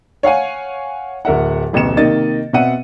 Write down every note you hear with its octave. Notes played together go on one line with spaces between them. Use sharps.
C#5 F5 F#5 G#5
D1 A#4 E5 F#5
D1 A1 B2 C#7 E7
C3 D#3 A#3 D#5 A6
B2 C4 E5 F#5 D#7